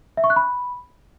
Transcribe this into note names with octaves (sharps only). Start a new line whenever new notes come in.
E5
C#6
F#6
B5